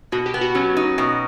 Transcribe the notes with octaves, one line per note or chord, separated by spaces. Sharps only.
B2 F#4
G4
B3
F#4
F#3 C#4
D#4
B2